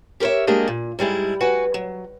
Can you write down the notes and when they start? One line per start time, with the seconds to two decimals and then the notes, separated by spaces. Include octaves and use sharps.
0.20 G4 A#4 B4 C#5 E5
0.47 F#3 G#3 A#3 D4 G4 D#5
0.68 A#2
0.99 G#2 G3 G#3 E4
1.41 F#4 B4 F#5 G#5
1.74 F#3